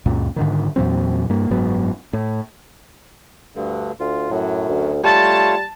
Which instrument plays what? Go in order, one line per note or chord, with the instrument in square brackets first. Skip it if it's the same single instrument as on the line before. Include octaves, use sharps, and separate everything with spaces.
[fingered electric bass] C#2 F#2 A#2
G#2 D3 D#3
E2 A#2 F#3 C4
G2 A#3
F#1 G#2 F#3 B3
A2
[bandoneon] D2 G2 D3
[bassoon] D2 [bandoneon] F4
[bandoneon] F#2 F#3 [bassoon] A2
[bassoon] D2
[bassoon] G3 [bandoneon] A3 F4 C#5 [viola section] A5